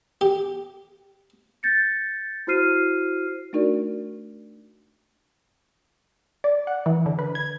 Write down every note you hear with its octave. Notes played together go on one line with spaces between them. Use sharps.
G4
G6 A6 A#6 C#7
E4 F#4 C5 F6 C7 D#7
A3 D4 D#4 F#4 A#4 D5
D5
F#5
E3
D3
B4
G#6